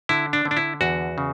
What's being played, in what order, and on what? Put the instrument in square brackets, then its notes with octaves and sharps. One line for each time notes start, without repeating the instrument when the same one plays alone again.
[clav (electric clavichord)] D3 E4
D4
D3
D4
E4
E2 F#4
C#3